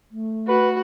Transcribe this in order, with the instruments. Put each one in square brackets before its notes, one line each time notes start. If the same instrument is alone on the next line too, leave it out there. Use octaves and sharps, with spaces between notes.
[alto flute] A3
[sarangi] F#4 [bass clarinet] B4